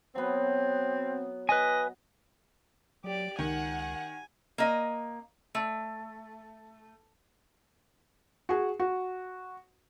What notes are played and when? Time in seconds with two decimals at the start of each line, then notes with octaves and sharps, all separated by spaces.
0.15 F#3 B3 C4
1.49 B4 D#5 G#5
3.04 F#3 G4 D5
3.39 C#2 D#3 F#5 G#5
4.58 A#3 D#5
5.55 A3
8.49 F#4 G#4
8.80 F#4